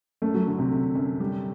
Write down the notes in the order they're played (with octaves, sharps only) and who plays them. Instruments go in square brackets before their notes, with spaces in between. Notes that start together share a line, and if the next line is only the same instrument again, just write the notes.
[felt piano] F#2 [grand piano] A3
[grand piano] F#3
[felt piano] D3
[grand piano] C3
[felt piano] D3
F#2
G3